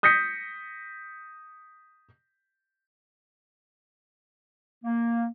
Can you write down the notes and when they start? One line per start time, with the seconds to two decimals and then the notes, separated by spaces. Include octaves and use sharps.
0.03 D#6 G6 A#6 B6 C#7
4.84 A#3